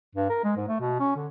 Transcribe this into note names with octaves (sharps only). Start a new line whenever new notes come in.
G2
A#4
G#3
G#2
A3
B2
C#4
D3